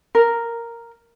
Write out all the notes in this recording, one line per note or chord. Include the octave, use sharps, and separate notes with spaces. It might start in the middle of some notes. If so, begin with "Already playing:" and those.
A#4